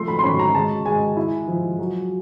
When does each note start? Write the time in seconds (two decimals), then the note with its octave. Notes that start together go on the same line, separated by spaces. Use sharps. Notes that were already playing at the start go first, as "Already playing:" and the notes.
Already playing: F3 A3 C6
0.08 B5
0.19 C6
0.24 C#4 B5
0.39 A#5
0.55 G#3 A5
0.86 G#3 G#5
1.17 E4
1.48 F3
1.79 F#3